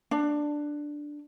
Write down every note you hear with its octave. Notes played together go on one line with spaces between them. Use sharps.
D4